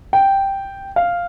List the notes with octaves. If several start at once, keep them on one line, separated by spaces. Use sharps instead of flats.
G5
F5